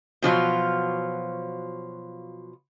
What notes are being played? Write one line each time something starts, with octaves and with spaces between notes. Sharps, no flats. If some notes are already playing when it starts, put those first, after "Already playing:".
B2 F3 F#3 F4